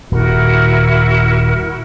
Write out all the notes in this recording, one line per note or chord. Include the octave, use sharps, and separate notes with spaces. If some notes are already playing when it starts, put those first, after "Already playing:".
D#1 E4 F#4 A#4